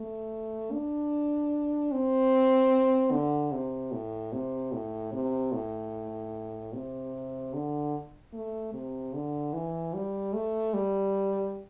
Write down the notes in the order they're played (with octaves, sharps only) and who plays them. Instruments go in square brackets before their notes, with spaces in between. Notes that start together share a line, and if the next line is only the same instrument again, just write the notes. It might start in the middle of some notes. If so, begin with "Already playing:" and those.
Already playing: [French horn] A3
D4
C4
D3
C3
A2
C3
A2
C3
A2
C3
D3
A3
C3
D3
E3
G3
A3
G3